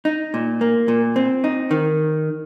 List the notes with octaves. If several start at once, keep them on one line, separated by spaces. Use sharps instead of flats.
D#4
A#2
A#3
A#2
C4
D#4
D#3